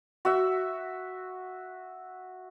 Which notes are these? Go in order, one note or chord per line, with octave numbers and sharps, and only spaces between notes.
F#4 E5